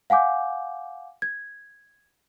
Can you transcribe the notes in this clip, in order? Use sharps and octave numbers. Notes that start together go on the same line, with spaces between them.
F5 F#5 G#5 D6 G6
G#6